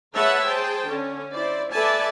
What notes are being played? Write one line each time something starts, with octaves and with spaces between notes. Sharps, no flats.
G#4 B4 C#5 E5 F#5 A5
G#4 C5 G5 A5
D3 C#4
E4 C5 D5
A4 B4 D5 E5 G#5 A5